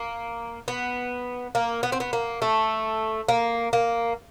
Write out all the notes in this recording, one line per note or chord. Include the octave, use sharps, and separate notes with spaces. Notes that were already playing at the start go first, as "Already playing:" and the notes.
Already playing: A#3
B3
A#3
B3
C4
B3
A#3
A3
A#3
A#3